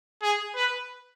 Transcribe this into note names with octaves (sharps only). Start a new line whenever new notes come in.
G#4
B4